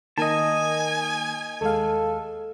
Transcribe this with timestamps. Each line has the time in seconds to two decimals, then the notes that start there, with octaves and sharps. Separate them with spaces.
0.18 D#3 A#3 A#4 D#5 G#5 A5
1.61 D#2 G#3 A4 F5